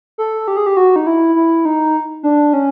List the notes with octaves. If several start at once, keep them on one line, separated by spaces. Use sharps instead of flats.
A4
G4
G#4
G4
F#4
D#4
E4
E4
D#4
D4
C#4